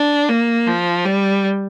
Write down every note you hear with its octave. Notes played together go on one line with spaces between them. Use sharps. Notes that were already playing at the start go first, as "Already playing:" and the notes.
Already playing: D4
A#3
F3
G3